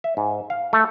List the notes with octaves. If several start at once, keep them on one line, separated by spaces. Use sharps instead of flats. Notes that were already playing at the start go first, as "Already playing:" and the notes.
E5
G#2
F5
A3